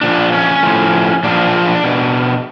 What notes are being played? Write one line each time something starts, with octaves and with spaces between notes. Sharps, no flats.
A#2 F3 D4
C#4
A2 F3
A#2 F3 D4
B2